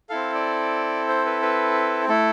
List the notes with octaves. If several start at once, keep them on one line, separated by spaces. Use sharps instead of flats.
C4 E4 A4 F5
D5
C5
B4
B4
A3 E4 A4